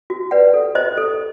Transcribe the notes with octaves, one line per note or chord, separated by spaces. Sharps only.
F#4
B4 D5 F#5
A4
C5 D#5
A4